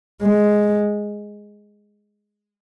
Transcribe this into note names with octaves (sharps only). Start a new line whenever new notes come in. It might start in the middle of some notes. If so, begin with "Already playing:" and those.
G#3